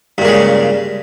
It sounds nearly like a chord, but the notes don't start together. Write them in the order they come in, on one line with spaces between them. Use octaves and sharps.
G2 A#2 G#3 C#3